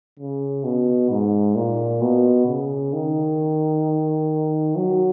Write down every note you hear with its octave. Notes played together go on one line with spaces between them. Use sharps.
C#3
B2
G#2
A#2
B2
C#3
D#3
F#3